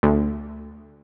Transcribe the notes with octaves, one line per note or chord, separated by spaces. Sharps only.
D2